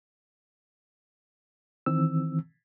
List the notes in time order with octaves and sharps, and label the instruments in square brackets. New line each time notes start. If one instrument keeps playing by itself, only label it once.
[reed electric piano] D#3 E3 C4 E6